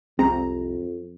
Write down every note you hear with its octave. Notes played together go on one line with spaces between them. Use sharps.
C2 F2 G#3 C4 A#5